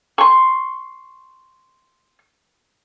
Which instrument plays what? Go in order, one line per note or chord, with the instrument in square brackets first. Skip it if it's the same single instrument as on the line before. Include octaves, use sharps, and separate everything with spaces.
[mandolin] C6 C#6